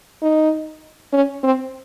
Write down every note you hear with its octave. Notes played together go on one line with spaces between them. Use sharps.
D#4
C#4
C4